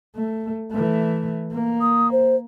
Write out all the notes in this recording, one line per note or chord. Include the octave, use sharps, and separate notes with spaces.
A3
E3 A3
A#3
D#6
C5